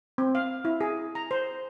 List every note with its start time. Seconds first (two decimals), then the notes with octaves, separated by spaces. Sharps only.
0.18 C4
0.35 F5
0.65 E4
0.81 G#4
1.15 A#5
1.31 C5